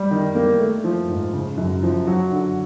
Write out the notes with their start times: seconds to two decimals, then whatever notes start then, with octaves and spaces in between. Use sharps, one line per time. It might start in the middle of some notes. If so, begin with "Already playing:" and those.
Already playing: G3
0.11 D#3
0.35 A#3
0.59 A3
0.84 F3
1.09 G#2
1.33 C#3
1.58 F#2
1.83 F3
2.07 F#3
2.32 D3